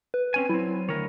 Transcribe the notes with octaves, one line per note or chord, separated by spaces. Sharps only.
B4
C4 C#4 G#5
F#3 C4 E4
D2 D#3 A#4 C#5